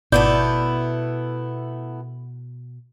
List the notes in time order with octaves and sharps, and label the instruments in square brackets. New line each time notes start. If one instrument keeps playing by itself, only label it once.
[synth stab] G#1 D5 G6 [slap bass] B2 [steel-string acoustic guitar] A3 B3 E4